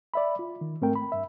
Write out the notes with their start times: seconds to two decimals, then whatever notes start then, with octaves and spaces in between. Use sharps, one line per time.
0.14 D5 E5 B5
0.39 F4
0.61 D#3
0.82 G#2 A3 C4 A#4 G5
0.96 B5
1.12 G2 E5